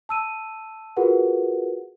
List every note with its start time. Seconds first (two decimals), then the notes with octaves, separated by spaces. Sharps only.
0.09 A5 E6 D#7
0.97 F4 F#4 G#4 A#4 B4 F#5